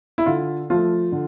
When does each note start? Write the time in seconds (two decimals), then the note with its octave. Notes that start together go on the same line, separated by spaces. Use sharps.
0.18 E4
0.26 D3 F4
0.70 F3 A3 F4
1.12 D3